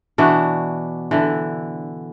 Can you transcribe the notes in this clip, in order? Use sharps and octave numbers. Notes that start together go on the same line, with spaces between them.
B2 E3 D4 F#4
D3 E3